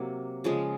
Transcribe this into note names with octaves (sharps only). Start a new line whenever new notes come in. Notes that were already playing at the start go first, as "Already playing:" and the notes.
Already playing: C3 F#3 A#3
C#3 F3 G#3